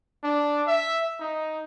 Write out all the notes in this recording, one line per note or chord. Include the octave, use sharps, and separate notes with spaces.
D4
E5
D#4